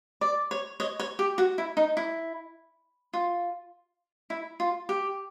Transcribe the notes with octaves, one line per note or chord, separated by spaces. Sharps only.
D5
C#5
C#5 D#5
C#5
G4
F#4
E4
D#4
E4
F4
E4
F4
G4